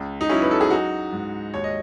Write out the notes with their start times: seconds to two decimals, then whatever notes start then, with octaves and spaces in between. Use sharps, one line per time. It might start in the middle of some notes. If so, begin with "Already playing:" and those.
Already playing: C#2
0.21 D#4
0.29 F#3 C#4 E4
0.42 B4
0.51 A4
0.61 G#4
0.70 F#3 D#4 F#4
1.12 G#2
1.54 D#2 C#5
1.64 D#5